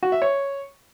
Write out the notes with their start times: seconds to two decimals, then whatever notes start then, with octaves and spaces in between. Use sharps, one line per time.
0.03 F#4
0.12 E5
0.22 C#5